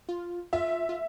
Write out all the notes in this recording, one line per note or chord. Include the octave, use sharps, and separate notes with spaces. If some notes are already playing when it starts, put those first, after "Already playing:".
F4
F4 E5
F4